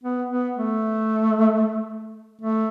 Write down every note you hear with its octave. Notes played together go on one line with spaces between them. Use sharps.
B3
B3
A3
A3